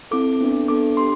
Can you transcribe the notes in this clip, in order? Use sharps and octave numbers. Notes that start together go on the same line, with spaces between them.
C4 E4 A4 D6
B3 D4 A4
B3 D4 A4 D6
D4 G4 C6